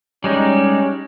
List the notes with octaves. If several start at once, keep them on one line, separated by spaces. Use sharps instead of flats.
G3 G#3 C#4 D#4